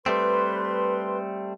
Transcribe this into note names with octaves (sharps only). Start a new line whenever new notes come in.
G3 A3 C4 B4 C6